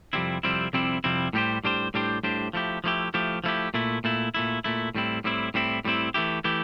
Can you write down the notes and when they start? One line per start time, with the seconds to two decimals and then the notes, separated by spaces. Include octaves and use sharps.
0.13 F2 C3 G3 C4 E4
0.43 F2 C3 G3 C4 E4
0.73 F2 C3 G3 C4 E4
1.04 F2 C3 G3 C4 E4
1.33 A2 G3 D4 G4 C5
1.64 A2 G3 D4 G4 C5
1.94 A2 G3 D4 G4 C5
2.24 A2 G3 D4 G4 C5
2.53 F3 A3 E4 G4
2.84 F3 A3 E4 G4
3.14 F3 A3 E4 G4
3.44 F3 A3 E4 G4
3.74 A#2 A3 E4
4.04 A#2 A3 E4
4.34 A#2 A3 E4
4.64 A#2 A3 E4
4.95 A2 G3 C4 E4
5.24 A2 G3 C4 E4
5.54 A2 G3 C4 E4
5.85 A2 G3 C4 E4
6.14 E3 A3 E4 G4
6.44 E3 A3 E4 G4